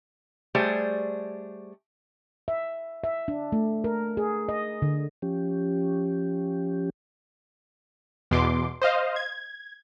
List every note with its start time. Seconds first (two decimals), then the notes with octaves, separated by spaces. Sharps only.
0.55 G3 A3 G#4 C5 D5
2.48 E5
3.04 E5
3.28 D4
3.52 A3
3.84 A#4
4.17 G#4
4.49 D#5
4.82 D3
5.22 F3 C#4 G4
8.31 E2 B2 C6 D6
8.82 C5 D#5 F5
9.16 G#6